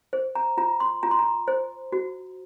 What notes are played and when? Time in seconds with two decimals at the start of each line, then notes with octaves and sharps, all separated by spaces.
0.13 C5
0.35 A#5
0.58 F4 A#5
0.80 C6
1.03 F4 A#5
1.11 C6
1.19 A#5
1.48 C5
1.92 F#4